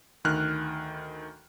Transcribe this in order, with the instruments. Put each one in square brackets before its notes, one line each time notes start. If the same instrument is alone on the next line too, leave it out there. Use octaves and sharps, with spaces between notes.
[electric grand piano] D2 D#3 F6 F#6